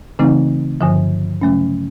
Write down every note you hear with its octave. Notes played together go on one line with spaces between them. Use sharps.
C#3 E3 A3 C4 D#4
G2 D3 F3
C#3 F#3 A3 C#4